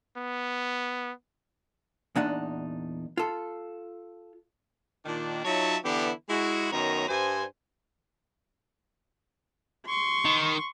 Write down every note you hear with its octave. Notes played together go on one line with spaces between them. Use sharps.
B3
E2 A#2 D4 D#4 F#5
F4 A4
A#2 D#3 D4
F#3 D#4 F4 C#5 E5 A5
D3 E3 B3 D4 E4 G4
G#3 E4 F#4
F#2 D#3 B3 C#5 A#5
G2 C5 G#5
C6 C#6
D#3